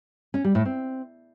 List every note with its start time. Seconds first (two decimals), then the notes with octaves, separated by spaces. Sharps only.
0.34 C#4
0.44 G3
0.55 A2
0.65 C4